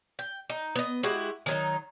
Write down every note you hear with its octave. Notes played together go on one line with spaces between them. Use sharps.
G5
D#4
B3 D#5
G#3 E4 F#4 G4
D#3 F#3 D#4